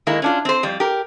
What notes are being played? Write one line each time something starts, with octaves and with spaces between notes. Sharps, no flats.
D#3 G#3 A#3 E4
C#4 D4 F4
C4 C5
F2 G3
G4 A#4